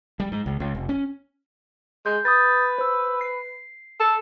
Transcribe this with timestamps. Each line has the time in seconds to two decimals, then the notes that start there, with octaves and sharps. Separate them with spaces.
0.20 G3
0.32 G#2
0.46 C#2
0.60 C#2
0.75 F1
0.89 C#4
2.06 G#3 G6
2.25 B4 D#6 G6 A6
2.78 C5 E6
3.21 C7
4.00 A4